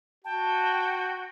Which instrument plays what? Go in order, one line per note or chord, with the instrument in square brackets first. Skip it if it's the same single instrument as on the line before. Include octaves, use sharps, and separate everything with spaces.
[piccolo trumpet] F#4 [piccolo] G5 [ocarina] A5